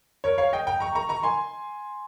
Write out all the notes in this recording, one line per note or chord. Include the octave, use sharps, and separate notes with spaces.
A#4 C#5
C#5 F5
D#5 G5
G5 A#5
A#5 C#6
A#5 C#6
A#5 C#6
G#5 C6